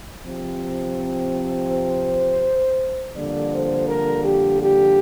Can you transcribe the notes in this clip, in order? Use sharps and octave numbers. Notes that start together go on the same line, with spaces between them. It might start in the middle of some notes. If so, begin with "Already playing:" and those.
C3 F3 C4
C5
F2 D3 G3 A#3 D5
C5
A#4
G4
G4